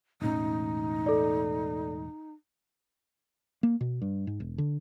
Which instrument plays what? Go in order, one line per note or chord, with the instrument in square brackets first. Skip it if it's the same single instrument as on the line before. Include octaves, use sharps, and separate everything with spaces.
[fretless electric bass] E1 A2 C#4 [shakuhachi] D#4
[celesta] A4 D5
[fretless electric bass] A#3
B2
G2
G#2
E1
D3